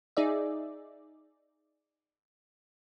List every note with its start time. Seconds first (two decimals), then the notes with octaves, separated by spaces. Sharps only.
0.17 D#4 G#4 D5 E5